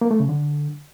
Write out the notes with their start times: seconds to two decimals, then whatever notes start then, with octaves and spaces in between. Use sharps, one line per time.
0.01 A#3
0.11 A3
0.20 C#3
0.29 D3